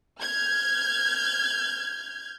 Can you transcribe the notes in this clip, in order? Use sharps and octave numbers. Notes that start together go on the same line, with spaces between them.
F6 G6 G#6